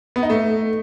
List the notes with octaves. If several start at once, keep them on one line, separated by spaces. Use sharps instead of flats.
B3
D#4
A3